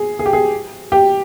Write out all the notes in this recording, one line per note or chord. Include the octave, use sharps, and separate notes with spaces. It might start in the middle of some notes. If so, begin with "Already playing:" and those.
Already playing: G#4
G#4
G4
G#4
G4